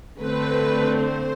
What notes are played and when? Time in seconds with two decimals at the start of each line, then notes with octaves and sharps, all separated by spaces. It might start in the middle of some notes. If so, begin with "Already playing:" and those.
0.20 D3 A3 C4 B4
1.00 C5